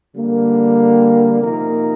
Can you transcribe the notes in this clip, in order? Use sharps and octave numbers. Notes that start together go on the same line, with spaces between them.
D3 G3 A#3
C3 F3 A#3 D#4 A#4